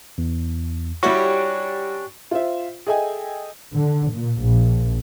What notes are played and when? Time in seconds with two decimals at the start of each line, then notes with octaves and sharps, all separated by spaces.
0.18 E2
1.03 G3 C#4 D4 E4 F#4 G4 C#6
2.31 F4 C5 E5
2.87 G#4 A4 D#5 E5 G5 G#5
3.73 D3
4.12 A#2
4.42 A#1